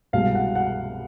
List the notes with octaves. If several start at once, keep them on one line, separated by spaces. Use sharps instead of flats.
C2 B2 G#3 F5
F#5
F#5